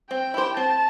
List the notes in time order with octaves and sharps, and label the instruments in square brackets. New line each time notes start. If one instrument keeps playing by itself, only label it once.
[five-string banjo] C4 [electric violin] G5
[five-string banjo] E4 G4 C5
[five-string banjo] C4 [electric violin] A5